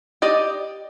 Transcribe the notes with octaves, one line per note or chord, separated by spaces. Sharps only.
G4 D5 D#5